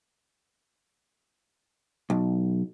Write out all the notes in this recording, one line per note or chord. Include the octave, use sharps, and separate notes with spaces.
B1